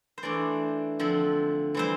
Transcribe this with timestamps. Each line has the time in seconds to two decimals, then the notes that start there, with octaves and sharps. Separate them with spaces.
0.18 C5
0.23 E3 A3 D4 D5
0.99 D3 F3 C4
1.75 E3 G3 C4 C5